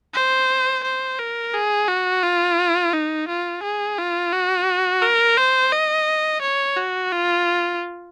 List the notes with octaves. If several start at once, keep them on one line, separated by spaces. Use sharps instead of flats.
C5
C5
A#4
G#4
F#4
F4
D#4
F4
G#4
F4
F#4
A#4
C5
D#5
C#5
F#4
F4